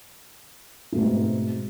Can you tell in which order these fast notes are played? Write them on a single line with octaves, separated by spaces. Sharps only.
A3 B2 C4 G#2